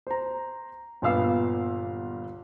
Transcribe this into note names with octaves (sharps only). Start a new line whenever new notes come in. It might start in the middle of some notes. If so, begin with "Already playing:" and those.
C5 A#5
G1 A#2 B3 F5 E6 C7